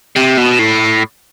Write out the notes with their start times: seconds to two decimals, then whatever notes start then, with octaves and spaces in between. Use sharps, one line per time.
0.16 C3
0.37 B2
0.59 A2